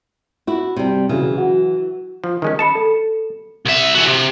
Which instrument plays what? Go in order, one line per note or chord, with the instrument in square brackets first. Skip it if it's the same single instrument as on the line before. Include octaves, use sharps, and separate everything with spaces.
[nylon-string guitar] E4 F#4
C3 G3
[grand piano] C#3 F#3 [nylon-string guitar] E3
[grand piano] F#3 F#4
[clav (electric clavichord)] F3
D#3 G#3 C#4
[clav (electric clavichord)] A5 [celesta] B5 C#7 E7
[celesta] A4
[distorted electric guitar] C2 E5
E3 F#4
C3